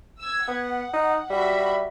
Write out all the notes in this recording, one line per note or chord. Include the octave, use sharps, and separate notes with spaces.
E6 G#6
B3 F#5
D#4
G3 F#4 E5 B5